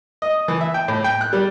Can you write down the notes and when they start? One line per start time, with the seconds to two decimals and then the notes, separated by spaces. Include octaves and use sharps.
0.22 D#5
0.48 E3
0.61 E5
0.74 G5
0.88 A2
1.04 G5
1.21 F#6
1.33 G3